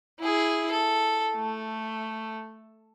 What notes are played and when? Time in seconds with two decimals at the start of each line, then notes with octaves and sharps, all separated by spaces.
0.20 E4 G#4
0.71 A4
1.36 A3